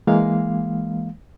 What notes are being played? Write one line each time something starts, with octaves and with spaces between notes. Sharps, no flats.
E3 G#3 A#3 F5